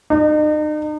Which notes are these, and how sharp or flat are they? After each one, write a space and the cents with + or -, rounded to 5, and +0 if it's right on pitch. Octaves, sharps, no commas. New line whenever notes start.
D#4 -40